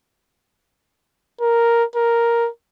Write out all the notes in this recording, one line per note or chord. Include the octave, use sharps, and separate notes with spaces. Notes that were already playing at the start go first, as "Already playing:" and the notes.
A#4
A#4